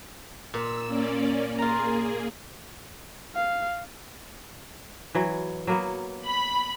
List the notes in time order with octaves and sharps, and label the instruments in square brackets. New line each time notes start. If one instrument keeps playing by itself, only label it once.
[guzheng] A#2 [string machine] E6
[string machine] A#3 C#4 D5
[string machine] A#3 G#4 [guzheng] F4 A#5
[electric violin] F5
[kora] E3 F#3
F#3 A#3 B3
[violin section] B5